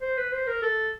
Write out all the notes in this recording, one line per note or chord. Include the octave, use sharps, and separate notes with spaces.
C5
B4
C5
A#4
A4